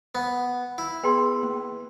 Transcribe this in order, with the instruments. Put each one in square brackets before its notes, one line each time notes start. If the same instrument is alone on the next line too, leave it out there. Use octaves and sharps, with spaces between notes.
[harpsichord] B3
E4
[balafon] B3 G#4 [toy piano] B4 G5 C6
[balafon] A#3